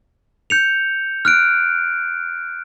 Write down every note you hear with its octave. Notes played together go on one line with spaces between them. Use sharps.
G6 C#7 F7
F6 F#6 D7